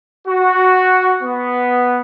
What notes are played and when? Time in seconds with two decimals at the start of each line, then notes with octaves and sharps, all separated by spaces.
0.28 F#4
1.23 B3